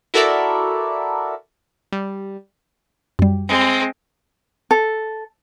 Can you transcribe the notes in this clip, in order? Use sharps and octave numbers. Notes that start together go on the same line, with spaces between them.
E4 F#4 A4 A#4 D5 E5
G3
F#2 G3
G#3 C4
A4